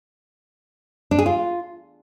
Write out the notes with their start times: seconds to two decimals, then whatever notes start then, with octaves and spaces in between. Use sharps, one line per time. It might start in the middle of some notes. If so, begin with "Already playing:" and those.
1.11 D4
1.19 G#4
1.26 F4